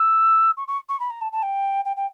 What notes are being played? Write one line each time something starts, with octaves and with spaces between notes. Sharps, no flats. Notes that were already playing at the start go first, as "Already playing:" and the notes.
Already playing: E6
C#6
C#6
C#6
B5
A#5
A5
A5
G5
G5
G5